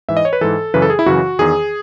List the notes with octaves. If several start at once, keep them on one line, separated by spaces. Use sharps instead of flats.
G#2 E3 E5
D#5
C#5
B4
G#2 E3 A4
F#2 C#3 E3 B4
A4
G#4
E4
F#2 C#3 E3 F#4
E2 D#3 G#4